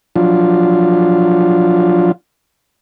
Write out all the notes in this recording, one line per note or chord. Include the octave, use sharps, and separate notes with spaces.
F3 F#3 D4 F4